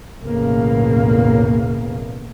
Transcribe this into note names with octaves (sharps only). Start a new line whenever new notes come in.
B1 E2 A2 C#3 A#3